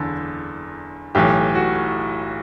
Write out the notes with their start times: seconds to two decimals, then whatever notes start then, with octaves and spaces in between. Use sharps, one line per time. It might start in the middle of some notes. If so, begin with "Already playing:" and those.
Already playing: F#1 E2 D3 A4
1.15 B1 A2 E3 G4
1.55 F#4